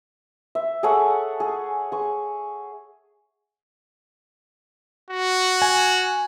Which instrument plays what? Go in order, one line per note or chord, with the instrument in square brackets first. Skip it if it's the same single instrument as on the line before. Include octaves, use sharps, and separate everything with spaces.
[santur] E5
G#4 A4 C#5 F#5
G#4
G#4 C#6
[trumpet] F#4
[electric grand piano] G#5